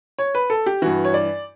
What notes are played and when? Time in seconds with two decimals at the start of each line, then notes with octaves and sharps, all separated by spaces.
0.19 C#5
0.35 B4
0.50 A4
0.66 G4
0.82 G2 E3 F#4
1.05 C#5
1.14 D5